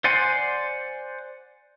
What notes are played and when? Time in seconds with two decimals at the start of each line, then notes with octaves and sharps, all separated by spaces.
0.04 C5 D5 F#5 G#5 C6